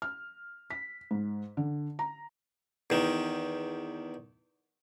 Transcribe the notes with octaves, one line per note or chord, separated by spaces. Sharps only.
F6
B6
G#2
D3
A#5
E2 D#3